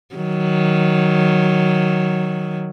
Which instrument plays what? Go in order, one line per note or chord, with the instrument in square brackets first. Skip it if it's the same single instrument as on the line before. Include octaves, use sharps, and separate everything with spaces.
[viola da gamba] D#3 F#3